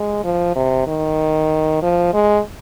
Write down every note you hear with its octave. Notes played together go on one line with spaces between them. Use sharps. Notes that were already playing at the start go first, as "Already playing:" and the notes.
Already playing: G#3
F3
C3
D#3
F3
G#3